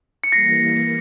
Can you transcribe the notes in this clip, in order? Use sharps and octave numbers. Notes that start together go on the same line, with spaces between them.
C#7
E3 G3 A#3 A#6 C7